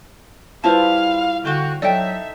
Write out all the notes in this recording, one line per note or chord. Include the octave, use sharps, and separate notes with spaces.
G3 E4 F4 B4 C5 F5 A5
D3 F#4 C5 F5 G5
F#3 D#4 A4 D5 E5 G5